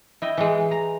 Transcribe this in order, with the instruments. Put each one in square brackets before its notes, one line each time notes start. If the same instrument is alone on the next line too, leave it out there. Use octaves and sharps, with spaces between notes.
[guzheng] E4 D#5 G5
E3 G#3
A#5